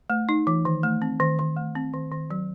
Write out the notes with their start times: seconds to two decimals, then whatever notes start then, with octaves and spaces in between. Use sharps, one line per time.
0.10 A3
0.29 D#4
0.47 E3
0.65 D#3
0.83 A3
1.02 C4
1.20 D#3
1.39 D#3
1.57 A3
1.75 C4
1.93 D#3
2.12 D#3
2.31 F#3